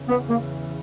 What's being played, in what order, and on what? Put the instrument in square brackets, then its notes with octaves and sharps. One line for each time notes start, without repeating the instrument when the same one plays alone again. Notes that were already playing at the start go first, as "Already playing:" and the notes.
Already playing: [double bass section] E2 C#3 E3
[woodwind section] B3
A#3